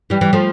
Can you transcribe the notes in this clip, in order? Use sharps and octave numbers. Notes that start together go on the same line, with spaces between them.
E3 G3
E3 G3
F3 A3